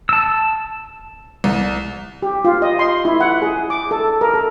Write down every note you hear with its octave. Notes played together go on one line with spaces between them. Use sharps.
A5 E6
C2
G4
F4
D#5
C6
E4
F#5
G#4
D6
A4
A#4
A4